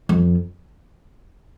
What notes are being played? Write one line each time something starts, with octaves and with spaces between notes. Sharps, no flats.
F2